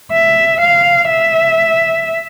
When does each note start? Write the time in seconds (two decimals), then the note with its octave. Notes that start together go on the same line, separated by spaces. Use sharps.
0.12 E5
0.61 F5
1.10 E5